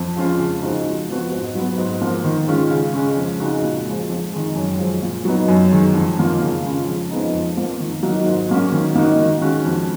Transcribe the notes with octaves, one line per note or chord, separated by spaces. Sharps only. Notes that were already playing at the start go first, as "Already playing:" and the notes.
Already playing: F2
F3 G#3 C#4 F4
C#3
F3 G#3 D#4 F#4
F2
F3 B3 F#4
G#2
F#3 B3
G#2
F3 A#3
D#3
G#3 C#4 F4
C#3
G#3 C#4
F2
C#3 G#3 D#4 F#4
A#2
F3 G#3
F2
D#3 G#3
F#2
F3 G#3
A#2
F#3 B3 D#4
F#2
D#3 G#3
F2
D#3 A#3 F4
C#3
G#3 C#4 F4
F2
F3 G#3 B3 D#4
F2
F3 A#3
D#3
F#3 A#3 D#4 F#4
G#2
F#3 A#3 C#4
D#3
A#3 D#4 F#4
D#3
G#3 C#4 F#4
F2